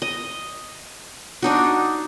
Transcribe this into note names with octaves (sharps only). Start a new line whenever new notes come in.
D#5
D4 D#4 F#4